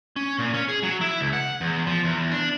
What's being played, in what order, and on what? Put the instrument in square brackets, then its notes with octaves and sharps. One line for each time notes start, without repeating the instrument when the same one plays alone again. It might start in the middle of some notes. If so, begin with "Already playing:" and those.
[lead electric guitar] C#4
A#2
C#4
G#4
F#3
E4
C#2
F#5
E2
F3
E2
D4